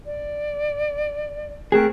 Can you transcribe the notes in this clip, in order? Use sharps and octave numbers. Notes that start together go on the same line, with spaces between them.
D5
A3 C4 G#4 A#4 G5 F#6